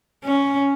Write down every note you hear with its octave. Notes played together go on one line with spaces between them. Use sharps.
C#4